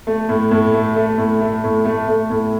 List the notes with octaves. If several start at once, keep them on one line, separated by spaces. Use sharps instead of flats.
A3
A2
A2
A3
A3
A2
A3
A2
A3
A3
A2